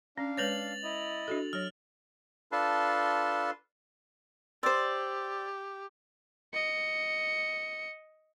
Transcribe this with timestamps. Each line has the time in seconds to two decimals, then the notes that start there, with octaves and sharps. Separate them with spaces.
0.18 C#4 D4 F5
0.37 G#3 B4 C#5 A6 F7 F#7
0.83 E4 D#5
1.28 D4 F#4 A4
1.53 F#3 C#5 F6
2.52 D4 F4 A4 B4 A5 C6
4.63 G4 C5 D5 C6 E6 A6
6.54 D#5 C#7